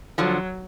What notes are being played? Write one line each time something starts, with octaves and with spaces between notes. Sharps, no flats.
D3 F3 F#3